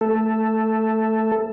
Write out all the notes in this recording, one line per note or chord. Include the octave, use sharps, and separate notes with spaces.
A3 A4